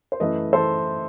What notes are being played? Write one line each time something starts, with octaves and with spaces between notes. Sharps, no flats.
C5
F#2 E3 A3 E4 B4 D#5
E3 A3 E4 A4 C5